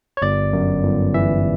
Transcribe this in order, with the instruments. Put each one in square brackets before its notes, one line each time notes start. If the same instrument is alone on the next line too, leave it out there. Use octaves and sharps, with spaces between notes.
[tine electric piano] C#5
G1 D5
F#2
G1
E3 E5